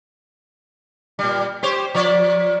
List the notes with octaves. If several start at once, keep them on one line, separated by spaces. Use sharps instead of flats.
A#2 G3
G4 C5 C#5
F3 C#5 D5